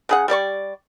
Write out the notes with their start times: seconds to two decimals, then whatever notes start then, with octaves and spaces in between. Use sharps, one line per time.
0.09 C#3 G#4 F#5
0.28 G3 G4 D5 C#6